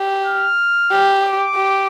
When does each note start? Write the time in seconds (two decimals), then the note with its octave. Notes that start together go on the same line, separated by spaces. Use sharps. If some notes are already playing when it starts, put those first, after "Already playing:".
Already playing: G4
0.25 F6
0.91 G4
1.24 D6
1.56 G4